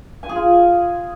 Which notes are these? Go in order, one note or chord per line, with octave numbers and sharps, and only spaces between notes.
G#5
G#4
F4